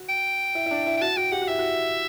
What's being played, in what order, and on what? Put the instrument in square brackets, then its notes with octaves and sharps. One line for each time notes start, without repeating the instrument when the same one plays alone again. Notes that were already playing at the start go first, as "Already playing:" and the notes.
Already playing: [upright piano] F#4
[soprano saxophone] G5
[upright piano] E4
E4
D4
E4
[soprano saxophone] G5
[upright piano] F#4 [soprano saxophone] A5
[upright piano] F#4 [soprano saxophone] G5
[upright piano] G4 [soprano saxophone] F#5
[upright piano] F#4
[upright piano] E4 [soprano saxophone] E5
[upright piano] F#4